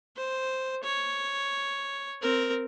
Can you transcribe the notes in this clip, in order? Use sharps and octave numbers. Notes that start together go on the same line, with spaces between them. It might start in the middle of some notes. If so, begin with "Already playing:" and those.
C5
C#5
C4 A#4